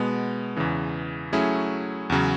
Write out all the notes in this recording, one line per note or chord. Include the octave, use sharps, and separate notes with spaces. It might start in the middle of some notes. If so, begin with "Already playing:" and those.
Already playing: B2 G#3 B3
E2 C#3 E3
F#3 A3 C#4 E4 G#4
E2 C#3 F#3